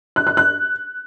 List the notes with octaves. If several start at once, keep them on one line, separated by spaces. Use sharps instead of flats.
F#6
F#6
F#6